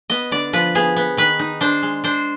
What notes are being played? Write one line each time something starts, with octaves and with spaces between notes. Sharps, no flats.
B3 D#5
D3 D5
F3 B4
B3 G#4
B3
D#3 B4
D#4
D4 C5
G#3
D4 C5